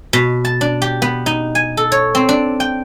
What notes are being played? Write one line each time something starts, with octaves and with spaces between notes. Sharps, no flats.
B2
A5
D4
G4
B3
D#4
G#5
A4
C#5
C4
D4
G5